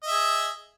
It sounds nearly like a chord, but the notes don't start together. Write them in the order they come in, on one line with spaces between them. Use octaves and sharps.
D#5 E5 G#4